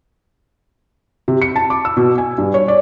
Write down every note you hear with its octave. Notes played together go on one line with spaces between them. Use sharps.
C3
C#7
A5
D6
E6
B2
G#5
G2
C#5
D5